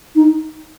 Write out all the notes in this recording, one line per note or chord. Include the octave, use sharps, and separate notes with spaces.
D#4